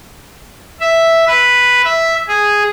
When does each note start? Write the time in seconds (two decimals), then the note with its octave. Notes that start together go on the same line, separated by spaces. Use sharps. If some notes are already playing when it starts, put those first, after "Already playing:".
0.80 E5
1.27 B4
1.84 E5
2.28 G#4